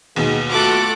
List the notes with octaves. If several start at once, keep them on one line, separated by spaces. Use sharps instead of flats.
D#2 B2 G#3
A3 F4 F#4 A4 D6 F#6